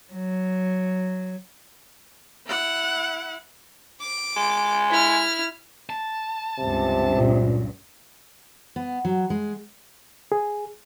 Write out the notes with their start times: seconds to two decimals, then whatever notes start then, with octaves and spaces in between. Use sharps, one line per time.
0.13 F#3
2.46 E4 F#5
4.00 D6
4.36 G#3
4.91 E4 F6
5.90 A5
6.59 C#2 G2 C3
7.16 A#2
8.76 B3
9.05 F#3
9.30 G#3
10.32 G#4